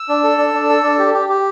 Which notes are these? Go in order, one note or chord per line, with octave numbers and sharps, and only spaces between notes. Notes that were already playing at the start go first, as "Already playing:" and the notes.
Already playing: E6
D4
A4
D4
D4
A4
D4
G4
G4
G4